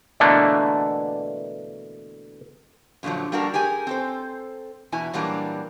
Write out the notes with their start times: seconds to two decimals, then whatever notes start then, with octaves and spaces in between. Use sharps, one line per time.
0.20 B2 D3 E3 A3 A#3 D4
3.03 F#2 A#2 D3 F3 F#3
3.32 G3 A#3 D4 F#4 A4 A#4
3.54 G4 G#4 A#4 G#5
3.87 C4 A4 C5
4.92 E2 B2 E4 G#5
5.13 A#2 E3 F#3 G3 A#3 D4